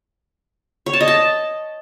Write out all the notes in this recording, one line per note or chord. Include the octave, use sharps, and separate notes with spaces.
C#5
A5
D#5
A5